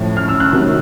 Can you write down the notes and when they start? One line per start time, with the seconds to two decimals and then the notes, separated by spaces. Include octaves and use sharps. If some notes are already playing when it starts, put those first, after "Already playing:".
Already playing: A2 F3
0.17 F6
0.28 E6
0.40 F#6
0.53 C3 D#3 F#3